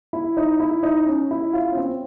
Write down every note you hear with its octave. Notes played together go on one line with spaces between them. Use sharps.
E4
D#4
E4
D#4
C#4
E4
F4
C#4
C4